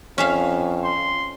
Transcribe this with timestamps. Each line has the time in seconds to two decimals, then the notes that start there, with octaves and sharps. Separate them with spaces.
0.18 F2 C#4 E5 F5
0.84 C6